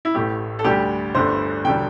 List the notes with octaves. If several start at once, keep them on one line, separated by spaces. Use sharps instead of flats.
E4
A1 A2 A3 G4
A4
D2 D3 G3 G4
G1 G2 D3 A3 C5
E1 D3 G3 G5